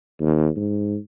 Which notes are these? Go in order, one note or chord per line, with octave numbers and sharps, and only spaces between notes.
D#2
G#2